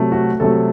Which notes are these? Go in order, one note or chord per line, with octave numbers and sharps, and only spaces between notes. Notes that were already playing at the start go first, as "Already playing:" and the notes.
Already playing: C3 F#3 A3
F#4
C3 F#3 A3 A4